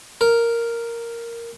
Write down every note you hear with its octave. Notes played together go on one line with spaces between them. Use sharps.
A#4